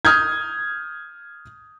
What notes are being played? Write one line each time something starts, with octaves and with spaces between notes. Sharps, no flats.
D#6 F6 G6 G#6